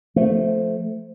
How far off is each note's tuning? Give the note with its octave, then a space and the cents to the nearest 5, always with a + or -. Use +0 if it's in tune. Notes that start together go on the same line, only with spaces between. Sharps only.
F3 +0 A3 +0